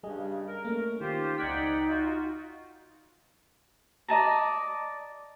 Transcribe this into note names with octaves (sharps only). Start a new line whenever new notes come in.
G2 C#3 G3 G#4 D#5
A#4
A3 A#3 C#4
D#3 F4 G4 C5
C#2 D#4 D5 F#5 G5 G#6 B6
F4 F#4
D5 D#5 A5 A#5